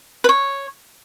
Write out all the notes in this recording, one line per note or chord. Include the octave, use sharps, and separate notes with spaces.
B4
C#5